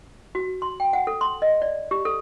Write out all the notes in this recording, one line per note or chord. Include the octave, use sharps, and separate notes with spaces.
F#4
C6
G5
F#5
A4
C6
D#5
D5
G4
A4